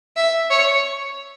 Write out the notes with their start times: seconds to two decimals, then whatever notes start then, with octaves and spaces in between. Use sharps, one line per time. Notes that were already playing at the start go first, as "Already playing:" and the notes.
0.16 E5
0.51 C#5